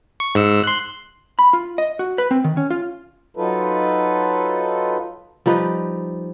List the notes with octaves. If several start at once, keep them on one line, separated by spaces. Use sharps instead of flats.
C#6
G#2 E6
C6 F#6
B5
F4
D#5
F#4
B4
C4
D#3
C#4
F4
F#3 D#4 F4 A4 B4
F3 G3 D#4 B4